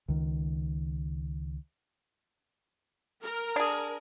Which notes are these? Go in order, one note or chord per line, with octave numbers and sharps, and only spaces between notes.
C#2 D#3
A#4
D4 G#4